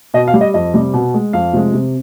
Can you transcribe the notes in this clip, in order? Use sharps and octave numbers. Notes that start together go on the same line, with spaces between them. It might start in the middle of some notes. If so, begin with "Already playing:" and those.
B2 D#5
F5
G3
D#5
F2 D#5
C3 G3
B2
G#3
F2 F5
C3 F3 G#3
C3